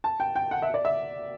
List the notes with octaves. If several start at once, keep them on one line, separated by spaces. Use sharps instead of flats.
A5
G5
G5
F#5
E5
D5
E5